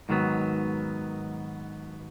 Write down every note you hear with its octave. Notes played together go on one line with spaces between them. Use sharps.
G#2 D#3 F#3 B3